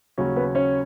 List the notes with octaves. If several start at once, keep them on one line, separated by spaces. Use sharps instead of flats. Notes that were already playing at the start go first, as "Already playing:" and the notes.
D#2 C#3 F#3 C#4
B3 B4
C#4 C#5